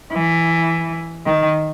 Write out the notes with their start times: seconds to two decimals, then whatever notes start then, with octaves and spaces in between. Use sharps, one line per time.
0.13 E3
1.26 D#3